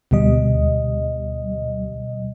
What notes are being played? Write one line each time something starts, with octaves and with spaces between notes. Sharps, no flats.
D2 B2 G3 D#5